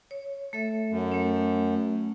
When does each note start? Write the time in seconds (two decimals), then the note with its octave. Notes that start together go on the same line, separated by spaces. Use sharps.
0.11 C#5
0.53 A3 A4 E5
0.90 F#2
1.12 A3 C#4